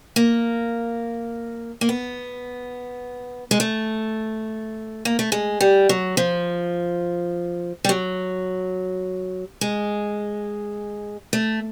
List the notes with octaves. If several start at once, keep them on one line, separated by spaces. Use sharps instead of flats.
A#3
A#3
B3
G#3
A3
A#3
A3
G#3
G3
F#3
F3
G3
F#3
G#3
A3